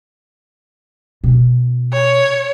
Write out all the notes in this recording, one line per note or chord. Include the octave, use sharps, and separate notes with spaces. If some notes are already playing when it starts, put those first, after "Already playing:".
B2 C#4
C#5